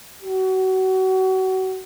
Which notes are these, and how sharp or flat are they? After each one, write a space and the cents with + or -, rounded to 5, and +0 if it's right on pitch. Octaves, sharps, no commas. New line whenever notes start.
F#4 +30